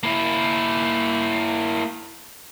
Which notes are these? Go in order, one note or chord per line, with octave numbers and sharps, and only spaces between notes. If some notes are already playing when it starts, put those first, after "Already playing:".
A#3 E4